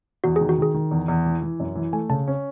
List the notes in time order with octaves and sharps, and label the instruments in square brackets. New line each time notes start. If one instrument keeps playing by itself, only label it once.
[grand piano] E2 [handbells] F#4
[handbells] G#4
[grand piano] D#3
[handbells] F#4
[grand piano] D#3 [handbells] G#4
[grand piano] D#3
E2
E2
E3
E3
F#2
E3
[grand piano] A3 [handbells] G#5
[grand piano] C#3 [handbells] A5
[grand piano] C#4